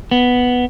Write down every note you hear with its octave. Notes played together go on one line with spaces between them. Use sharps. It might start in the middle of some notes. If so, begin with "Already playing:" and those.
B3